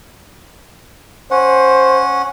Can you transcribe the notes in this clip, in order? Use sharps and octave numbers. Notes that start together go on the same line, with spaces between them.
C#4 C5 F#5